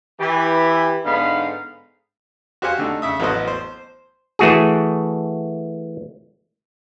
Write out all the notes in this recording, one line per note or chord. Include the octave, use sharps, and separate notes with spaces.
E3 G4
G#2 D3 B3 D#4 F5 B5
F#4 G4 C5 F5 F#5 G#5
D3 A3 D#4
C#3 E5 D#6
A1 F#3 B3 F#4 C5 D#5
C5
E3 A3 F#4 G#4